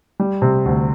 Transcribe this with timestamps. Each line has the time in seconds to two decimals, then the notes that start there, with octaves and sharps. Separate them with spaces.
0.20 G3
0.42 C3
0.66 D2